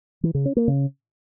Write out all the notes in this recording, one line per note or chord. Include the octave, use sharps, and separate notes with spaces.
E3
C#3
C#4
A#3
C#3